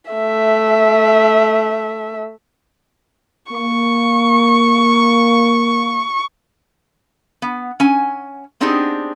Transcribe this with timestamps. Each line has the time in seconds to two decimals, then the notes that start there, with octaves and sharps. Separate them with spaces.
0.11 A3 E5
3.52 A#3 C#6
7.42 B3
7.80 C#4 G#5
8.60 B3 C4 D4 D#4 G4 G#4